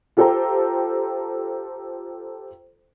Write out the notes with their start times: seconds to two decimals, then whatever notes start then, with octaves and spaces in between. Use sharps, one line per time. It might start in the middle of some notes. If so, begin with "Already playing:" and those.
0.17 F4 G4 A4 C5 G5 A#5